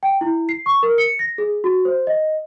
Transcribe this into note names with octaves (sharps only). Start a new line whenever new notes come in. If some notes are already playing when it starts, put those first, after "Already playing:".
G5
E4
C7
C#6
A#4
C#7
A#6
G#4
F#4
C5
D#5